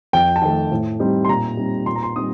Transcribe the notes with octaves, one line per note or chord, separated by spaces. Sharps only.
F2 G5
A5
D#3 A3 G5
A2
G3 C4 D#4
C6
A#2 A#5
G3 C4 D#4
A#2 C6
A#5
C6
G3 C4 D#4 D#6